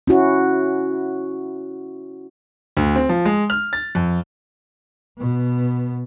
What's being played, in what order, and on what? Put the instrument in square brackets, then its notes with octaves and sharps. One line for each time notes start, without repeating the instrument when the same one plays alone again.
[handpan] C#4 E4 F#4
[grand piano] D2
C4
F3
G#3
F6
A6
F2
[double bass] B2 B3